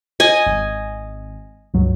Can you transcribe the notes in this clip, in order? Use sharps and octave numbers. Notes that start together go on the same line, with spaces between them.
D#5 G#5
G#1
C#2 G2 F#3